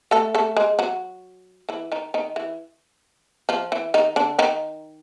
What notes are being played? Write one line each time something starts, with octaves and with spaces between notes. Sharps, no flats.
A3 A4
A3 A4
G#3 G#4
F#3 F#4
E3 E4
D#3 D#4
D#3 D#4
E3 E4
F3 F4
E3 E4
D#3 D#4
D3 D4
D#3 D#4